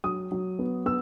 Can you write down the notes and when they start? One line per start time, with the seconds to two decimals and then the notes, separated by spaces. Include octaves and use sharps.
0.04 F#3 D#6
0.32 F#3
0.59 B3
0.86 B3 E6